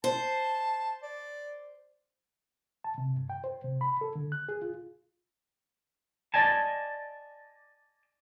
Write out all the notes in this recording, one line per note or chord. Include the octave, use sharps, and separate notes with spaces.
C5 A5
D5
A5
C3
G2
G5
C5
C3
B5
A4
D3
F#6
G#4
F4
D5 D#5 G#5 A5